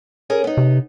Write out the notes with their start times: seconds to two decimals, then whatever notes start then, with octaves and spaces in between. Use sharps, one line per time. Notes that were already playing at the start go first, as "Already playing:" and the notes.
0.30 C#4 G#4 A#4
0.44 B3 D#4
0.57 C3